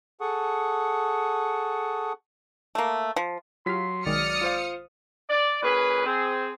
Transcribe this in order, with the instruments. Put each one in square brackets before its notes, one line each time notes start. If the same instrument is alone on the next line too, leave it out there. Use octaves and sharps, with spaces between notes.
[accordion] G#4 A4 F#5 A5 C#6 D#6
[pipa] A3 A#3
F3
[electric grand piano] F#3 B6 [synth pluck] F4 G4 F5 [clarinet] C6
[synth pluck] B1 D#3 G#3 [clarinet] D5 [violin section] D#6 F6 C#7
[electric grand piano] F4 C5 F5
[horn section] D5
A#2 C#4 G#4 B4
C4 G#4